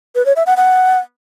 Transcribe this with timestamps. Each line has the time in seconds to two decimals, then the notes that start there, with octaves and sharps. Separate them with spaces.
0.15 B4
0.26 C#5
0.36 E5
0.46 F#5
0.57 F#5